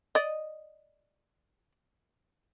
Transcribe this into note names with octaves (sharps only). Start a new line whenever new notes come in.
D5 D#5